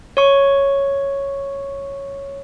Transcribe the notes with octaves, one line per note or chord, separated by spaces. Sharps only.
C#5 C#6